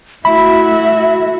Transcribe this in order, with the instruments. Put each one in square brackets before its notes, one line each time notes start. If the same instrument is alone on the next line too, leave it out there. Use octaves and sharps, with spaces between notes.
[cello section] A3 E4 F#4 [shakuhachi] E5 [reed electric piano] B5